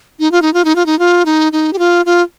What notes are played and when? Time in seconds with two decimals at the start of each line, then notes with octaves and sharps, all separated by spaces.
0.19 D#4
0.32 F4
0.42 D#4
0.54 F4
0.65 D#4
0.75 F4
0.86 D#4
0.99 F4
1.25 D#4
1.52 D#4
1.73 G4
1.79 F4
2.06 F4